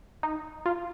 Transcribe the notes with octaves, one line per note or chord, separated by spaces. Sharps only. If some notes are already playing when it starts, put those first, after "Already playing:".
D#4
F4